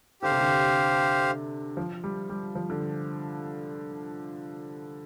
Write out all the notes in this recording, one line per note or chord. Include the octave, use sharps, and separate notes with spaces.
D3 G4 C5 F5
C3
D3
F3
G3
G3
F3
D3